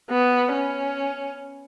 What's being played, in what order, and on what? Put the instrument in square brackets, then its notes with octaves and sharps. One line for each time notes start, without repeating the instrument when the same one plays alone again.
[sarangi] B3
C#4